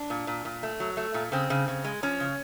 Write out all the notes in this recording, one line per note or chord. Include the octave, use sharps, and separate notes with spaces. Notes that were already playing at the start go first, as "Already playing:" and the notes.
Already playing: D4
A#2
A#2
A#2
A3
F#3
A3
A#2
C#3 C4
C#3
C#3
G#3
F3 C#4
C#3